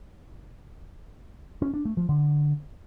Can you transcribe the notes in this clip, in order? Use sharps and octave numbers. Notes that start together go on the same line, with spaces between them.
C#4
D4
A3
F3
D3